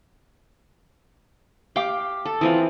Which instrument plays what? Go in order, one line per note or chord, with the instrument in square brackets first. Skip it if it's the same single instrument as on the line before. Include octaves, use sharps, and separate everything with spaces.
[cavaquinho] G4 F5 D6 [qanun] G5
[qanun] A4
[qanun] E3 C4 [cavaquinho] F4 B4 D#6